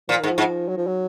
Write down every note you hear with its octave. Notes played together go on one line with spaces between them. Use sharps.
A#2 F3
G#2 D#3
F3
G#2
F#3
F3
F#3